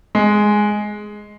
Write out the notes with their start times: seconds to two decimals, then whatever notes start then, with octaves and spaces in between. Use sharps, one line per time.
0.15 G#3